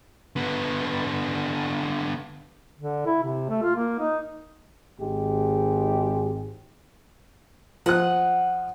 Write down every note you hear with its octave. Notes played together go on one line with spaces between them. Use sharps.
D3 B3
D3
E4
C3
A3
F4
A#3
D#4
G#1 G#2 G#3 G4
F3 D#5 F#5 F#6